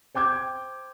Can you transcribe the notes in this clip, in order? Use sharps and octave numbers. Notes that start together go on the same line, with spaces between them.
C5 G5 D6 G6 G#6